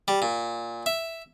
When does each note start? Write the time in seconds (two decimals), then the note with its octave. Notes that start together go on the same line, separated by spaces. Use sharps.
0.08 G3
0.22 A#2
0.86 E5